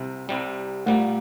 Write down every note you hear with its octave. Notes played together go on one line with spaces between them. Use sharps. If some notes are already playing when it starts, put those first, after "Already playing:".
Already playing: C2 C3
C2 C3 G3
A#2 G3 A3 A#3